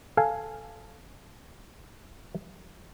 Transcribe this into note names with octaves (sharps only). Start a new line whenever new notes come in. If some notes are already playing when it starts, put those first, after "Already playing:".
A4 F5 G#5